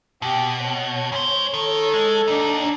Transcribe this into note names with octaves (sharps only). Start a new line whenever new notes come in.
B2 G4
C#5
G#2 C5
D#3 A4
G#3
D#2 D4 D#4